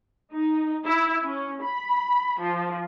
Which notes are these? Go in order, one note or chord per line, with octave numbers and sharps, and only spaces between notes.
D#4
E4
C#4
B5
F3